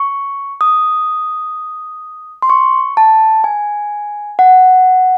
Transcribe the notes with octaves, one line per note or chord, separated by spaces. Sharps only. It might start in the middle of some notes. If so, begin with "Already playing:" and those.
Already playing: C#6
D#6
C6
C#6
A5
G#5
F#5